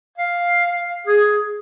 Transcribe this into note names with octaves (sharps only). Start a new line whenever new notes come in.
F5
G#4